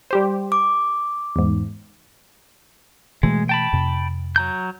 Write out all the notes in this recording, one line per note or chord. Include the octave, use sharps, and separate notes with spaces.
G3 G4 C5
D6
E2 G#2
B2 E3 G#3 A3
G5 A5 B5
F2 C3
F#3 A#5 G6